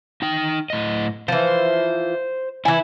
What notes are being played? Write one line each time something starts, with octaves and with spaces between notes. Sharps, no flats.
D#4 G5
A2 D#5
E3 F3 C5
E3 E4 G#5